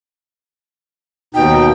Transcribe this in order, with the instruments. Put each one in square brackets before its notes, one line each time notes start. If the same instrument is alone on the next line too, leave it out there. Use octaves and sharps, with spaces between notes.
[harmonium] D#2 B2 D#4 [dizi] G5